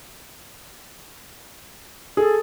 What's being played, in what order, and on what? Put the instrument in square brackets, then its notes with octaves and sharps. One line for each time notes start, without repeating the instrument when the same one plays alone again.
[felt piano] G#4 [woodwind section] A4